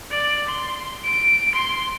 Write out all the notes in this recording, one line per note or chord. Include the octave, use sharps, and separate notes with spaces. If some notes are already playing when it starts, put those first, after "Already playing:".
D5
C6
D7
C6